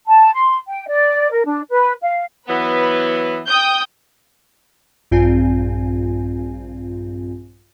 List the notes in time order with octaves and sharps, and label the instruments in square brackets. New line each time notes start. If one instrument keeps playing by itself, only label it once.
[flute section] A5
C6
G5
D5
A#4
D4
B4
F5
[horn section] E3 F#3 B3 [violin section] B4
[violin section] G5 D#6 G6
[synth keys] A#1 G2 C4 F4 G#5